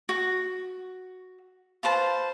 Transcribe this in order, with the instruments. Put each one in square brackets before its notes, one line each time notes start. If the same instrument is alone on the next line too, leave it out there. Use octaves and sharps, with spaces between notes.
[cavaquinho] F#4
F4 B4 C5 A5